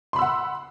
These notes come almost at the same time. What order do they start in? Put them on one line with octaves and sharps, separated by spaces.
C6 B5 E6 F#5